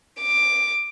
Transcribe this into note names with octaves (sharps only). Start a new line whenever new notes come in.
D6